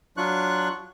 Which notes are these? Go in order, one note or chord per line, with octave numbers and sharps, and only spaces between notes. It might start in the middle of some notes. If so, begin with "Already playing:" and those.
F#3 D4 F4 C#6 F#6